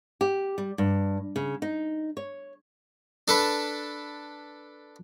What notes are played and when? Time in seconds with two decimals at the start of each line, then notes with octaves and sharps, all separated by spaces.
0.21 G4
0.58 G3
0.78 G2
1.36 C#3
1.62 D#4
2.17 C#5
3.28 D4 A4 B4